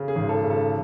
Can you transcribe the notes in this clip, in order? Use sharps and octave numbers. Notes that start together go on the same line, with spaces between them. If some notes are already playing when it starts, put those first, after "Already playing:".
Already playing: C#3
G#4
G#1
A4
C#3
A4